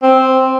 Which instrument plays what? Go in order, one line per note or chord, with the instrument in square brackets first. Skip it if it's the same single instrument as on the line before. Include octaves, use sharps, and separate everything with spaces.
[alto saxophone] C4